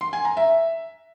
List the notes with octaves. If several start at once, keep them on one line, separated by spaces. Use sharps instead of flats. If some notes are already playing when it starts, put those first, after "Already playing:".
C6
G#5
A#5
E5